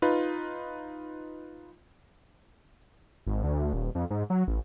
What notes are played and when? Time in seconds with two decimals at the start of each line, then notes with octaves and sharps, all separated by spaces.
0.02 D#4 F4 B4
3.26 G#1
3.44 D2
3.73 D#1
3.95 F2
4.10 G#2
4.30 F#3
4.48 A1